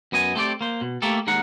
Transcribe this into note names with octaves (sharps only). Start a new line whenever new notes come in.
F#2 B3 D#5 G#5
A3 C4 G4 D5
A#3 C5
B2
A3 A#3 G4 A4
D#2 D#3 G#3 A#4 F#5